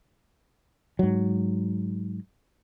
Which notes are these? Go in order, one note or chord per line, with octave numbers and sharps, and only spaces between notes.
G#2 F#3